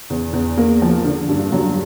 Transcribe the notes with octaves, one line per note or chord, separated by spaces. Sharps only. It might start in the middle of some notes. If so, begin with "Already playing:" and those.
E2
E2
A#3
F3
D3
G2
F#3